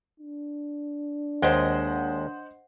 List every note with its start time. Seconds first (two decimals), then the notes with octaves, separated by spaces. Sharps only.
0.20 D4
1.42 D#2 G#3 C5 D#5 F#5 G5